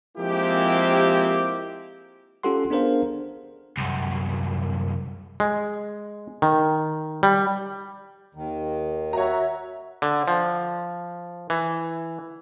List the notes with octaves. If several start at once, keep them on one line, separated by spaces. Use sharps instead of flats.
F3 G#3 A#3 C4 E4 G4
C#4 F4 G4 A4 F#5 C6
B3 D4 G#4 A#4 C5 F5
C2 F#2
G#3
D#3
G3
D#2 D#3
F#4 C#5 E5 A#5
D3
F3
E3